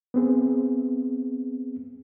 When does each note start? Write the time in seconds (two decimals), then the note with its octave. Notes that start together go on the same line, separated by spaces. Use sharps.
0.14 B3 C4 G#4